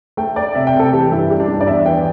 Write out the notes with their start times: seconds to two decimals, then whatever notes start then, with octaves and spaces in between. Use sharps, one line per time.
0.17 A3 G5
0.36 A3 D5
0.55 C3 E5
0.67 G5
0.74 C3
0.79 A4
0.92 E3 G4
1.12 G2 E4
1.30 G3 G4
1.40 D4
1.48 G2
1.61 D5
1.67 E2 E5
1.86 E3 G5